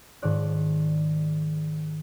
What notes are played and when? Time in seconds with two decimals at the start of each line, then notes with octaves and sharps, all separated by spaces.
0.22 G#2 D#3 F3 D5 F#6